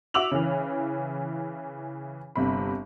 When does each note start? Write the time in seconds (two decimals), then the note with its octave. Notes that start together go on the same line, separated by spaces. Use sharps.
0.14 F#4 E5 D6 E6 F7 F#7
0.31 C#3 E3
2.36 G1 C3 B5